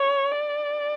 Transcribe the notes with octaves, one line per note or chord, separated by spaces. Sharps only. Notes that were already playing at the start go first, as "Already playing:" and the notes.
Already playing: C#5
D5